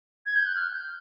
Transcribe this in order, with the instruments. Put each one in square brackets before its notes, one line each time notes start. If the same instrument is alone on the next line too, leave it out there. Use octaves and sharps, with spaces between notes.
[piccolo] G#6
G6
F#6
F6
G6